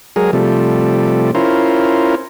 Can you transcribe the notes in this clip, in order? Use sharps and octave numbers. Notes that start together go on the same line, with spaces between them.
F#3 G#3 G#4 A#4
C3 F3 G3 A3
C#4 E4 F4 A#4 C5